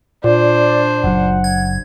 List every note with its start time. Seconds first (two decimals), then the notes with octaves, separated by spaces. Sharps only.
0.24 A#2 D4 C5 D5
1.04 F#1 F#3 F#5
1.44 G#6